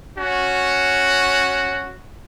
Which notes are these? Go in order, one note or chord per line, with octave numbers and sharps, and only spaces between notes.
C#4 F#4